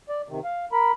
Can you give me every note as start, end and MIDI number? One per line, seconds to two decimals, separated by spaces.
0.09 0.22 74
0.29 0.40 48
0.29 0.40 51
0.44 0.65 77
0.72 0.92 70
0.72 0.92 83